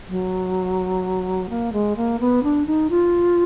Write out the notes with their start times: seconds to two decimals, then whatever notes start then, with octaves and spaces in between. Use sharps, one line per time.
0.09 F#3
1.50 A#3
1.73 G#3
1.97 A#3
2.20 B3
2.43 D4
2.67 D#4
2.90 F4